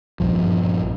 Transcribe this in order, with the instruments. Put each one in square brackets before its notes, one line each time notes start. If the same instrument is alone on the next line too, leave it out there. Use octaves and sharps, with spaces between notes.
[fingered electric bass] A#1 G2 F3